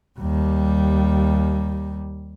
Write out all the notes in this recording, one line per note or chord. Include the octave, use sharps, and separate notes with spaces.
D#2 G3